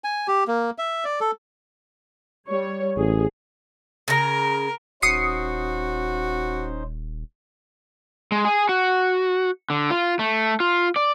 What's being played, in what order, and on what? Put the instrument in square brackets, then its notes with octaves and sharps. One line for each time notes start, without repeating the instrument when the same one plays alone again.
[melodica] G#5
G4
A#3
E5
D5
A4
[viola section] G3 C#5
[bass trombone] A1 [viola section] G#4
[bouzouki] C#3 A#5 [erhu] A#4
[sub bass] D#1 [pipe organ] C#4 D#4 C5 [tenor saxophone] F#4 [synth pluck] D#6 C7 C#7
[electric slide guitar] G#3
G#4
F#4
D3
F4
A3
F4
D5